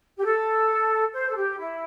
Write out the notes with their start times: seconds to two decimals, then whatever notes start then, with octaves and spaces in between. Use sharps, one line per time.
0.18 G4
0.24 A4
1.13 C5
1.29 A4
1.36 G4
1.58 E4